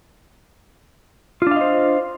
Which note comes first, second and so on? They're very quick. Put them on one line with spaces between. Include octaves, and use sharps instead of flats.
F4 D4 F5 D#5 C5